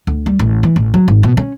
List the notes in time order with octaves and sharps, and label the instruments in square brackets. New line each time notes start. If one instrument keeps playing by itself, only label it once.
[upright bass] D2
G3
A1
E3
A1
F#3
G#1
B2
C#4